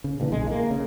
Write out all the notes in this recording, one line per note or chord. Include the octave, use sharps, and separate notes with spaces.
C#3
G2 A#2 D3 E3
B1 G#3
A3 A#3
C#3